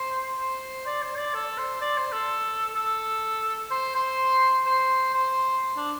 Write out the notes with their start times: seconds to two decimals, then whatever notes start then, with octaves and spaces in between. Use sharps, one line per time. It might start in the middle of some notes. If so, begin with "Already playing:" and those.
Already playing: C5
0.39 C5
0.86 D5
1.02 C5
1.18 D5
1.34 A4
1.58 C5
1.81 D5
1.97 C5
2.12 A4
2.75 A4
3.71 C5
3.95 C5
4.66 C5
5.14 C5
5.76 D4